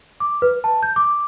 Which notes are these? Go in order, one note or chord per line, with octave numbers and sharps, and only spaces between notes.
D6
B4
A5
G6
D6